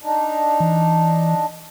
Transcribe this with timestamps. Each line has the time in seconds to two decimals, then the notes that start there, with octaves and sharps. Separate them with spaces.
0.02 D4 D#4
0.60 E3